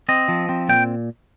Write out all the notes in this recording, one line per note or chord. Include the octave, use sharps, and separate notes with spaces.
C4 D#5
F3
C4
A#2 G5